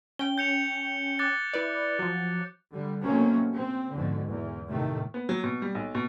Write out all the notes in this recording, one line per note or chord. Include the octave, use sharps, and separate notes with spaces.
C#4 G5 G7
G6 C#7 F7
D6 F#6 A6
E4 B4 D5
F3 F#3
D3 G3
B2 F#3 A3 A#3 C4 C#4
C4
F2 G#2 B2 D3
E2
A2 C3 D#3 A3
B3
F#3
B2
G3
B1
B2